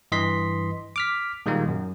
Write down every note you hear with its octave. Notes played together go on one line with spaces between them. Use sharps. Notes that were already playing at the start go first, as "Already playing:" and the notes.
G2 E3 D#5 C6 B6
D6 F6 B6
A#2 D#3 G3 G#3 A#3
F#2